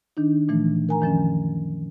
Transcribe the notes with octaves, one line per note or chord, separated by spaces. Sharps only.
D#3 D4 D#4
A#2 E3 F3 A3
A#4 G#5 A#5
F#2 D#3 F3 C#4